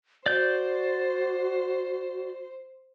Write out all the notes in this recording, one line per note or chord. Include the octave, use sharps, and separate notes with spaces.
F#4 C5 D5 G6